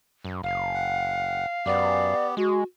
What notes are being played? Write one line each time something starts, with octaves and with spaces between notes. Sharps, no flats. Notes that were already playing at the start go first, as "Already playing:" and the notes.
F#2
F#1 F5
F#5
F#2 B3 G4 D5
G#3 F#4